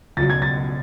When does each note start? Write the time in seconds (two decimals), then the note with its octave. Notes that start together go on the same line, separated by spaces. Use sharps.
0.17 C#2 B2 F#3 A6
0.30 G#6
0.42 A6